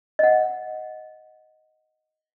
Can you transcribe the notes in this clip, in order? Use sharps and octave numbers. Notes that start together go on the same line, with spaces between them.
D#5 F#5